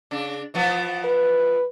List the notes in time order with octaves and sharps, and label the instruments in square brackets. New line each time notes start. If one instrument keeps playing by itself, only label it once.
[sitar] C#3 D4
E3 F3 B3
[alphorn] B4